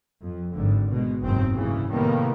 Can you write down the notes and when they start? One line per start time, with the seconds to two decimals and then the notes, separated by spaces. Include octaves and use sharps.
0.22 F2
0.55 G#1 G#2 D3
0.89 B2 G#3
1.21 F#1 D#2 G#2 B2 D#3 C4
1.54 C2 G#2 C#3 E3
1.90 A2 C3 D#3 G3 A#3 B3